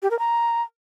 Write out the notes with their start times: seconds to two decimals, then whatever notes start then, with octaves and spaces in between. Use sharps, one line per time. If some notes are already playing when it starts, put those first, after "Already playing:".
0.02 G4
0.11 A#4
0.19 A#5